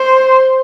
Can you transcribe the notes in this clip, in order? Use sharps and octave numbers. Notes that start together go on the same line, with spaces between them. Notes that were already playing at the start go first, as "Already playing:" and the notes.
Already playing: C5